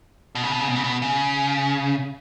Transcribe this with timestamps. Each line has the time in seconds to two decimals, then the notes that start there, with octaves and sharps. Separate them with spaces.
0.35 B2
0.43 C#3
0.51 B2
0.59 C#3
0.67 B2
0.76 C#3
0.84 B2
1.02 C#3